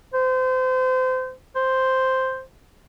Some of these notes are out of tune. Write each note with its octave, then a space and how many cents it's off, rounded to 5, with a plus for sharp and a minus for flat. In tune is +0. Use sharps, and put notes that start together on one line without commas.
C5 -30
C5 +0